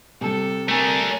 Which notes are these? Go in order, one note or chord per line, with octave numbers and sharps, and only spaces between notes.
C3 G3 A4
A3 D4 A#4 G#5